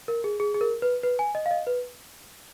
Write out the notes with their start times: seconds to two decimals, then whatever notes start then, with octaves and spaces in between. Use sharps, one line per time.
0.08 A#4
0.24 G#4
0.40 G#4
0.54 G#4
0.61 A#4
0.82 B4
1.03 B4
1.19 G#5
1.35 D#5
1.46 F5
1.51 D#5
1.67 B4